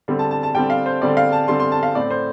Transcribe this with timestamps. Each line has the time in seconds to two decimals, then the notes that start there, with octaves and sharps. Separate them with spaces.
0.08 D3 G3 C4
0.19 A5
0.31 A5
0.43 A5
0.55 D3 G3 C4 G5
0.70 F5
0.86 C5
1.02 D3 G3 C4 D5
1.17 F5
1.32 A5
1.48 D3 G3 C4 C6
1.60 C6
1.72 A5
1.83 F5
1.95 A2 A3 C4 D5
2.11 C5